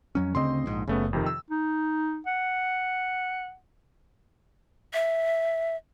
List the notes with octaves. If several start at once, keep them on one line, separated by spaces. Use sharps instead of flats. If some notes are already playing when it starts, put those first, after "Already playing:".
F2 F#3 C#4
D2 C#3 C4 D#5 C6
A#1 G#2
F#1 C#3 A3 B3
F2 C3 D#3
E6
D#4
F#5
E5